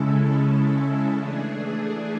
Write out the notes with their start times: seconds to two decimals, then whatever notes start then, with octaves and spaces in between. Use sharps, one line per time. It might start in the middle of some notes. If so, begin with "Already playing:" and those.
Already playing: C#3 G#3 C#4 E4 A4
1.17 E3 A3 D4 G#4